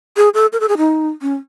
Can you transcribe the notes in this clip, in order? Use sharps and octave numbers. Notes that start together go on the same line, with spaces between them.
G#4
A4
A#4
A4
G#4
D#4
C#4